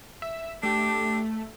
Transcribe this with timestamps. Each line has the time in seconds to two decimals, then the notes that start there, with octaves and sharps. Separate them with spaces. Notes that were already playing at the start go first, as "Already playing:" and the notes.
0.22 E5
0.63 A3 D4 G4